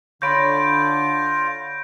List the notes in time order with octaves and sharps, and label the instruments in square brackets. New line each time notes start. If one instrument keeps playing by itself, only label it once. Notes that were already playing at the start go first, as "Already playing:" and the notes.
[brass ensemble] D3 [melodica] F4 [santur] C#5 B5 [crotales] G6 A#6 D7